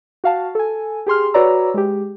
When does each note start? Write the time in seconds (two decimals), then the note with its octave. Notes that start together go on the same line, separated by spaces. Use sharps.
0.24 F#4 F5 A5
0.55 A4 G#5
1.07 G4 G#4 C6 F6
1.34 F#4 B4 C#5 D5 A#5 E6
1.74 G#3 G4